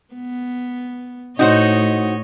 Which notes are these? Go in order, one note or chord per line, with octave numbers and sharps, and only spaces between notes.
B3
A2 D#4 F#4 C5 C#5 D#5